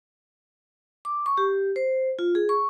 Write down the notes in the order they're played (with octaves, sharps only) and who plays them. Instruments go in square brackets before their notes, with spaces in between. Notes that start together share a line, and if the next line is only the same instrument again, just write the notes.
[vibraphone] D6
C#6
G4
C5
F4
G#4
C#6